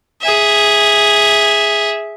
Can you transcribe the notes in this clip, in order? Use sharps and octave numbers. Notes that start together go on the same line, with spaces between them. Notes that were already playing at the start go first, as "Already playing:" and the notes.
G#4 E5